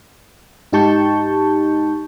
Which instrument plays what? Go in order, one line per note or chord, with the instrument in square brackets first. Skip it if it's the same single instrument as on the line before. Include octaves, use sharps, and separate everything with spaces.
[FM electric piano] G#2 D#4 G4 A5 C#6 G6